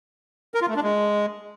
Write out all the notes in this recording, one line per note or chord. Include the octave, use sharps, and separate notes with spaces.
A#4
F4
A3
D4
G#3